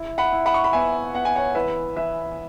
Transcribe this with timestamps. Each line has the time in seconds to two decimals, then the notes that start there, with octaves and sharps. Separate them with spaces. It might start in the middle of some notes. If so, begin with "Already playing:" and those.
Already playing: E4
0.18 F#5 B5
0.32 E4
0.46 F#5 B5
0.54 C#6
0.64 B5
0.73 B3 E5 G#5
1.13 B3 F#5
1.25 G#5
1.36 C#5 F#5
1.55 E3 B4 E5
1.96 E3 B4 E5